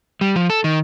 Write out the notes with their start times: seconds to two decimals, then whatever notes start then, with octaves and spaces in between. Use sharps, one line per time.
0.21 G3
0.36 F3
0.50 A4
0.64 D#3